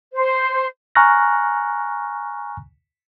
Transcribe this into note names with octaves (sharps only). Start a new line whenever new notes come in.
C5
G#5 A#5 C#6 F6 F#6 A#6